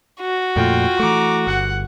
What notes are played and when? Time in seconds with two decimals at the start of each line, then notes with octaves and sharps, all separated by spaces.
0.21 F#4
0.56 F2 A#2 A3 F4 G5
1.00 E3 A3 A#5 D6
1.47 G1 F#5